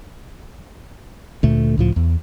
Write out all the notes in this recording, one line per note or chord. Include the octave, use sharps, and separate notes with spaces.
D2 A#2 A3
C#2 A2 F3
E2